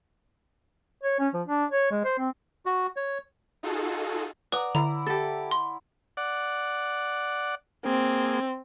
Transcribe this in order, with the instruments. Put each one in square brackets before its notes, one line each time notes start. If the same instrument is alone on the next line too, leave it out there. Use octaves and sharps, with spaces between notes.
[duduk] C#5
C#4
F3
D4
C#5
G#3
C5
C4
[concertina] F#4
C#5
[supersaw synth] D#4 F4 F#4 G#4 A4
[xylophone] B4 [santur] D5 F#5 A#5 [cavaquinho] D#6
[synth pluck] D3 [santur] E4 [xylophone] A#5
[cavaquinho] G4 A4
[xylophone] C6
[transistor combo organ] D5 F#5
[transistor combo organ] A#3 G#4 [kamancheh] C4